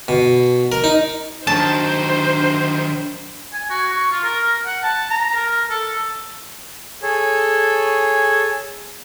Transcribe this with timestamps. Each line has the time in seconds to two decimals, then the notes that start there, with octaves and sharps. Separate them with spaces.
0.08 B2
0.72 A#4
0.84 D#4
1.47 D#3 F#3 D4 C5 A5
3.53 G#5
3.70 F#4
3.92 C#6
4.11 F4
4.24 A#4
4.66 F#5
4.83 A5
5.11 A#5
5.35 A#4
5.70 A4
7.02 G#4 A4 C#5